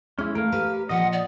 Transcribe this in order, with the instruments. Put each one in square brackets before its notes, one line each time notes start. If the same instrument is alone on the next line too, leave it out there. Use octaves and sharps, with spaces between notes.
[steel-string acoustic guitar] G#3 [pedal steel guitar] C#4 E4
[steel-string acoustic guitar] A3 [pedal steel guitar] A#4 F5
[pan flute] G4 [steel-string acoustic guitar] B4
[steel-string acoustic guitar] A#2 F3 [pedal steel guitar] D#5 [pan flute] F#5
[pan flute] D5